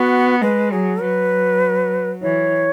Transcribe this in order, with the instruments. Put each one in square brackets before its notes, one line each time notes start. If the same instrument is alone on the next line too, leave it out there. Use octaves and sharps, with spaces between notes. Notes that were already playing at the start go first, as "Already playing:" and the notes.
Already playing: [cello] B3 [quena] F#4
[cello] G#3 [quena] B4
[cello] F#3 [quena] G#4
[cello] F#3 [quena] B4
[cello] E3 [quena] C#5